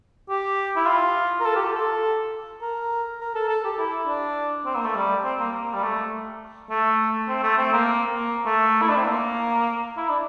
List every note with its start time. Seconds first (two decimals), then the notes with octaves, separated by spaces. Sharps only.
0.29 G4
0.76 E4
0.87 F4
1.40 A#4
1.46 A4
1.56 G4
1.65 F4
1.75 A4
2.62 A#4
3.21 A#4
3.35 A4
3.49 A4
3.64 G4
3.79 E4
4.07 D4
4.66 C4
4.75 A#3
4.85 A3
4.95 G3
5.24 C4
5.39 A#3
5.53 A#3
5.73 G3
5.83 A3
6.70 A3
7.29 C4
7.43 A3
7.57 C4
7.73 A#3
8.16 A#3
8.46 A3
8.82 E4
8.89 D4
8.97 C4
9.04 A#3
9.97 E4
10.09 D4